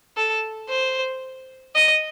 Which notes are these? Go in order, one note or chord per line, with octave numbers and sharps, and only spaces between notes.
A4
C5
D#5